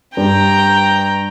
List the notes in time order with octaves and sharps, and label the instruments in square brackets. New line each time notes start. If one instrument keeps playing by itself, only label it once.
[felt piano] G2 G3 [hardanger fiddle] G5 A#5